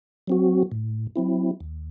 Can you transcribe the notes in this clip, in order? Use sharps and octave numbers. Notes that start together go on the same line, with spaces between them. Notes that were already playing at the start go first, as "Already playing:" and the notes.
F#3 C4 F#4
A2
F#3 C4 E4
D#2